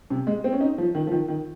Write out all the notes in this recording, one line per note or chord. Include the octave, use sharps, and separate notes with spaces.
C3
G#3
C4
C#4
D#4
F3
D#3
F3
D#3
D#3